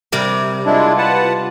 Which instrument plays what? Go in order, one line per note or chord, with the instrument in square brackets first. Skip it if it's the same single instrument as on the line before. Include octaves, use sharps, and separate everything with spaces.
[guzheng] C3 G3 A#4
[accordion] G#3 D4 E4 [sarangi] F4
[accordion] B4 F#5 A5